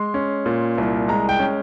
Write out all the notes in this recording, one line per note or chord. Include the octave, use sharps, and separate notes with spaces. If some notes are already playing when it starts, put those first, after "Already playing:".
Already playing: G#3 C6
C#4
A#2
C2
G#3 A#5
G5
C#4